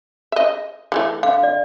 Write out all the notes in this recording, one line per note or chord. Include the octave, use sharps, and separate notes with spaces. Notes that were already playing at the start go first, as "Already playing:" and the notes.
D#5 E5
E3 G#3 A3
D3 F5
D5